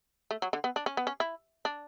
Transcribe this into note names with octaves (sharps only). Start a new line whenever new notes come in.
A3
F#3
D3
B3
D4
C#4
B3
C#4
E4
D4